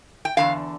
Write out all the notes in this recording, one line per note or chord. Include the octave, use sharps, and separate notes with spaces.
G5
E2 D3 G3 D4 F5